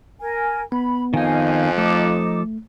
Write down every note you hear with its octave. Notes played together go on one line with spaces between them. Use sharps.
A#4 G#5
B3 B5
F2 D#3 D#4 F5 G#5
F3 A3 D#4 A4 D6